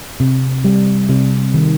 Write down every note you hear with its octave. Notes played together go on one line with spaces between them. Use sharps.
C3
G3
C3
D#3